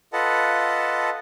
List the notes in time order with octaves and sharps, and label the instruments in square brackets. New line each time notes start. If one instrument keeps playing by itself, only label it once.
[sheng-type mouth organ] F4 A4 B4 D#5 F#5 A5